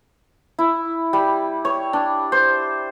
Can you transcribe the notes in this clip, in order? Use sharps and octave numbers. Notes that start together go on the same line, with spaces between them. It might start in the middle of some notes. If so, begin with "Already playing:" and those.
E4
G3
C#5
D4
C5